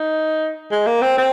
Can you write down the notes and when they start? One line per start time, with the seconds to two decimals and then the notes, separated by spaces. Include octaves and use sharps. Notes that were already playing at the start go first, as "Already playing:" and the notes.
Already playing: D#4
0.71 G#3
0.87 A#3
1.02 C4
1.17 C4